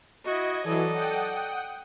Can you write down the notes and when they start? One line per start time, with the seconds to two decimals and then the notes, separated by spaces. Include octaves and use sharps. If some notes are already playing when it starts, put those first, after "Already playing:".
0.25 E4 F#4 D#5 G#6
0.64 E3 F#3 A4 D5 D#5
0.94 F#5 G5 D#6